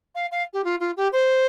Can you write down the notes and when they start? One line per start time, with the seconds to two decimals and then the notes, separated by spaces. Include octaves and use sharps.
0.15 F5
0.31 F5
0.53 G4
0.64 F4
0.80 F4
0.97 G4
1.12 C5